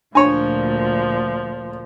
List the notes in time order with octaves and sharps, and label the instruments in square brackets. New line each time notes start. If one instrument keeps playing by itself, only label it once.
[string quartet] D2 A#2 F3 [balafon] D4 [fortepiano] C#5 G#5